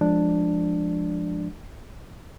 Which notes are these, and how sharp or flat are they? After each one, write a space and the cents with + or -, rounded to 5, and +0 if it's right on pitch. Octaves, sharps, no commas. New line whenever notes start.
F3 +0 G#3 +0 D4 +5